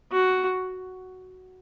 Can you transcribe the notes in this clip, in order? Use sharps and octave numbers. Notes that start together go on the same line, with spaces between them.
F#4